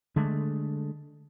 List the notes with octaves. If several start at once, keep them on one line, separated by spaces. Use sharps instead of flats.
D3 G#3 A3